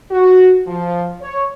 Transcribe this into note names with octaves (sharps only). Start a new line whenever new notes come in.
F#4
F3
C#5